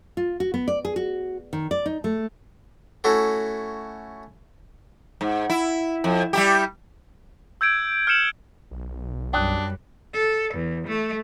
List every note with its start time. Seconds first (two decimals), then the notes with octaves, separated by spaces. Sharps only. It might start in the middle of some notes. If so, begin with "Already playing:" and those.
0.17 F4
0.40 F#4
0.54 B3
0.68 D5
0.85 G#4
0.96 F#4
1.53 D#3
1.71 D5
1.86 D#4
2.04 A3
3.04 A3 C#4 E4 F#4 A4
5.21 G#2
5.50 E4
6.04 F2
6.33 G3 E4 G4
7.61 E6 G6 G#6 D7
8.07 F6 G6 C#7 E7 F#7
8.71 B1
9.33 F#2 G3 D4 G5 D#6 F#6
10.14 A4
10.54 E2
10.87 A3